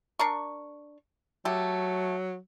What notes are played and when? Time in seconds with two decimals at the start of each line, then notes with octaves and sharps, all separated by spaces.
0.19 D4 A#4 C#6
1.45 F#3 A3 G4